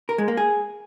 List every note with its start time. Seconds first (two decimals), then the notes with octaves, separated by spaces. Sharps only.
0.09 A#4
0.18 G#3
0.28 A#3
0.37 G#4